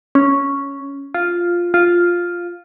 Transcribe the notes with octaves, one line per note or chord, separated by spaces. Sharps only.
C#4
F4
F4